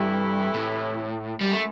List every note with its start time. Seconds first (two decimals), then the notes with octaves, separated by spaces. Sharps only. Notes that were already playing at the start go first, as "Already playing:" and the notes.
Already playing: G2 C3 E3 A3 E4
0.54 A2
1.41 F#2 G3
1.51 A3